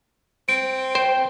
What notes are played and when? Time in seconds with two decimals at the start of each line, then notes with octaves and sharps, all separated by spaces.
0.49 C4 D7
0.95 C5 G5